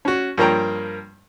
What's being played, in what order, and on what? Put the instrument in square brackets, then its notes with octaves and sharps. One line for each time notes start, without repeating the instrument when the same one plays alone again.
[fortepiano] C#4 F#4
G2 F3 A#3 C#5 G5 A#5